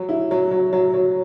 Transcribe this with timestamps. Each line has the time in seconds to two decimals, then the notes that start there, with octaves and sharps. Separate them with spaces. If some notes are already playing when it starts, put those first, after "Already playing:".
Already playing: F#3
0.09 E4
0.31 F#3
0.51 F#3
0.73 F#3
0.94 F#3